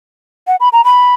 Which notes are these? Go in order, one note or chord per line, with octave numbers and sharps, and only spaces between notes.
F#5
B5
A#5
B5